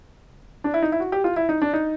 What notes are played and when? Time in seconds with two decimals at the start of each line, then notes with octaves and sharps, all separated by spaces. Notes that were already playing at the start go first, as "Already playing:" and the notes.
0.64 D4
0.74 E4
0.82 D#4
0.92 E4
1.00 F#4
1.12 G4
1.24 F4
1.36 E4
1.49 D#4
1.62 D4
1.73 D#4